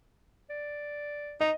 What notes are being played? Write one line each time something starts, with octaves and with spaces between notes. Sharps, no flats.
D5
D#4 D#5